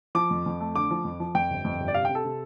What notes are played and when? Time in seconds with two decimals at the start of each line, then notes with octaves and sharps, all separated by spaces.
0.15 F3 D6
0.30 F2
0.46 F2
0.60 A3
0.75 D3 D6
0.91 F3
1.04 F2
1.20 F3
1.35 F2 G5
1.50 G1
1.65 F2
1.80 G1
1.88 D5
1.94 C3 F5
2.05 G5
2.09 C3
2.15 A4
2.25 C3